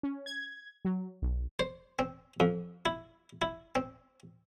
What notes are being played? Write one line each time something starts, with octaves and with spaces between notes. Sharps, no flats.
C#4
G#6
F#3
B1
C5
C4
F2
E4
E4
C4